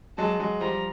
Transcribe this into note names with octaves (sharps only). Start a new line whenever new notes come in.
F#3 G#3 A5
F#3 G#3
F3 G3 A#5